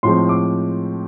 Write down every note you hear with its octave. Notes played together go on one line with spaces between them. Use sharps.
A2 F3 G#3 C4 C6
D6